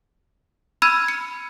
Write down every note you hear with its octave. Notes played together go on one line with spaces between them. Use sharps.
B5 E6 F6 G#6 D#7
C#7